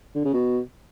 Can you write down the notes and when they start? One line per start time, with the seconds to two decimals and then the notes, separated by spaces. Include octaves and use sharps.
0.15 D3
0.24 C#3
0.34 B2